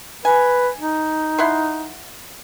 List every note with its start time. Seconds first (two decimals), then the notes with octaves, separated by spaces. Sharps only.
0.25 B4 G#5
0.79 D#4
1.39 E4 F#5 C6